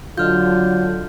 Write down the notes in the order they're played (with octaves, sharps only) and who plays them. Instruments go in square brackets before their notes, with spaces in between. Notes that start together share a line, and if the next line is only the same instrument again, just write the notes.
[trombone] D3 [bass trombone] F#3 [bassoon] F4 [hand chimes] D#5 F6 G6